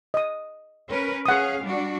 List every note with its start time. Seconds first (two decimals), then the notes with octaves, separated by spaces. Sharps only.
0.14 D#5 D#6
0.87 C#4 A#4 B4
1.26 C#4 G#4 F5 F#5 D#6
1.62 G3 D4 F#4